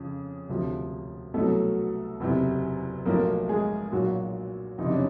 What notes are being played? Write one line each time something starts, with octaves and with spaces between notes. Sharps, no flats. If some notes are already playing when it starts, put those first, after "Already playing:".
Already playing: F2 C#3 F3
E1 D2 C3 F3
C2 B2 F#3 A3 A4
F#1 E2 C3
B1 A2 F3 A#3 A#4
G#3 G#4
B1 A#2 F#3 F#4
F#1 F2 C3 F3 D#4
D4
C#4